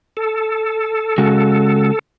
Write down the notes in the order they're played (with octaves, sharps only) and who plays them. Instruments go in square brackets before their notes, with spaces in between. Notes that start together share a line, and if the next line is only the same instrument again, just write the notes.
[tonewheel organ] A4
[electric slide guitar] C#3 G#3 F#4